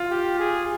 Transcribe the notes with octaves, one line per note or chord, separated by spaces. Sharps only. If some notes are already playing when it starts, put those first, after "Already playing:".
Already playing: F4
G4
G#4